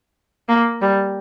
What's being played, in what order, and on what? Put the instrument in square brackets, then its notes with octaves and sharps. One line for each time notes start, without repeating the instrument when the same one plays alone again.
[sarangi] A#3
G3